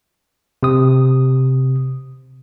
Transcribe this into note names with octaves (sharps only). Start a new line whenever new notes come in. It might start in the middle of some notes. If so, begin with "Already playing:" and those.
C3 D#6